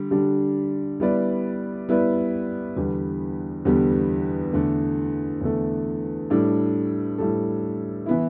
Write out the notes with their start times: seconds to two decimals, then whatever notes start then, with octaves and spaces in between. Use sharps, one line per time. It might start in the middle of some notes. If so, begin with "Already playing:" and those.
Already playing: D3 G3 D4
0.11 D3 G3 D4 G4
1.00 G3 B3 E4 B4 D5
1.89 G3 B3 E4 B4 D5
2.76 E2 D3 G3 B3 G4
3.65 E2 D3 G3 B3 G4
4.53 E2 D3 A3
5.41 E2 D3 A3
6.30 A2 G3 D4 A4
7.18 A2 G3 D4 A4
8.06 E3 B3 E4